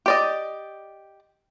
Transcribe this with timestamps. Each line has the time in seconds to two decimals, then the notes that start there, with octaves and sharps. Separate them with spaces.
0.06 G4 D5 D#5